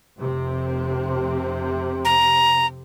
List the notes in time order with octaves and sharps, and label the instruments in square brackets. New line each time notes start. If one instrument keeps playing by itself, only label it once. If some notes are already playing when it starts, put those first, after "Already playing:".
[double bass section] F1 C3 C4
[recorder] A#5